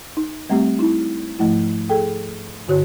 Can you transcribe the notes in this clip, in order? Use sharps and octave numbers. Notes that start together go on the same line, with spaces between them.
D#4
G3 A3 C4 G4
D#4 E4
G#2 F3 A3 E4
G#4 A4 G5
G2 D3 F#4 C#5 F#6